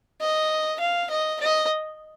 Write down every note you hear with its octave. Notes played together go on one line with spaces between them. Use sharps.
D#5
F5
D#5
D#5